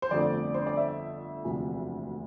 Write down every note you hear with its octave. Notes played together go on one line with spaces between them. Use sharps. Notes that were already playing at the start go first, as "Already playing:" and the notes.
C5
G1 F2 D3 A3 D5
C5
D5
E5
E1 D2 C3 F3